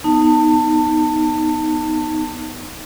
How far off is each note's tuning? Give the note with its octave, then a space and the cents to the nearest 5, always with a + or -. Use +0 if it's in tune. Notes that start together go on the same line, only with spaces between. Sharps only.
B3 +0 D#4 +0 A5 +25